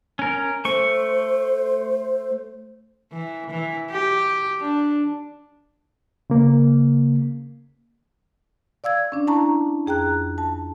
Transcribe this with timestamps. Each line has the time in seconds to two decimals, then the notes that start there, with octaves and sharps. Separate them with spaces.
0.19 C#4 A#4
0.65 A3 C5 C#6
3.13 E3
3.51 E3
3.91 G4
4.60 D4
6.30 C#3 A#3
8.84 D5 F5 E6 G#6
9.12 C#4 D4
9.27 E4 A5 A#5 C#6
9.87 F2 G#4 G5 A#5 F#6
10.38 A5